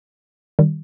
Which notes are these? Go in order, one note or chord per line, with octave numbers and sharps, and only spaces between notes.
D#3 G3